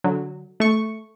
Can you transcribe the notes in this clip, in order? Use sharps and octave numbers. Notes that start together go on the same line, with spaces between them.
D3 F#3
A3 C#6